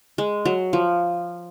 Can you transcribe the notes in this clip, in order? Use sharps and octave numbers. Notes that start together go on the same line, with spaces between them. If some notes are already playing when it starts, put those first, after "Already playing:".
G#3
F#3
F3